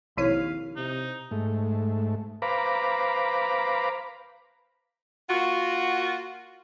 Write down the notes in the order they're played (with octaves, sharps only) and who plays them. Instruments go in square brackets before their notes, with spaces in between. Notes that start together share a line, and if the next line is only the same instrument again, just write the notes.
[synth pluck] A#1 C#5 B6 [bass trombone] D#2 [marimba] B2 C4 E4 [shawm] F5
[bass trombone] C3 [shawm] D#4
[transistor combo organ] G#2 A3
B4 C5 F5 A#5 B5 D6
[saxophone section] A#3 F4 F#4